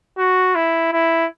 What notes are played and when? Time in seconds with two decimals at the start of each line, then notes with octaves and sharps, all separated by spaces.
0.18 F#4
0.55 E4
0.93 E4